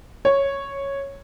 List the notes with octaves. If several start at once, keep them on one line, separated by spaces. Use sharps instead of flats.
C#5